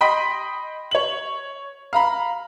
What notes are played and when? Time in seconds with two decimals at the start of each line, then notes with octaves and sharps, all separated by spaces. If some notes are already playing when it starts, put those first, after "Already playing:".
0.01 D#5 G5 B5 C6 B6
0.91 C#5 F#7
1.93 F5 A#5 B5